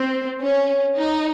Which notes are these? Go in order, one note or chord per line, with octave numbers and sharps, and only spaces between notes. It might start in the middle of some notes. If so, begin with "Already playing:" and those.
Already playing: C4
C#4
D#4